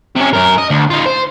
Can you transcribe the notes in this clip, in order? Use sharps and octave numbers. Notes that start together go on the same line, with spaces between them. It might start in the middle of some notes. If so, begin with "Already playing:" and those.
C3 C#4
F#2 A#4
D#5
D2
D#4 F4
C5